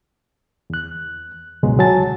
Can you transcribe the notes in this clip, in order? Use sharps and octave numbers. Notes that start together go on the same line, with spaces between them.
E2 F#6
C#2 G#2 B2 D3 F#3 G#3
C2 F#3 G#5 A5 A6